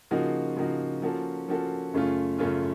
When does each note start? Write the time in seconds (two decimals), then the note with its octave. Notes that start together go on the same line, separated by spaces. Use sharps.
0.11 C#3 F3 A#3 D#4 F#4
0.57 C#3 F3 A#3 D#4 F#4
1.02 F3 A#3 C#4 F#4 A4
1.48 F3 A#3 C#4 F#4 A4
1.94 F#2 C#3 A3 C#4 F4
2.39 F#2 C#3 A3 C#4 F4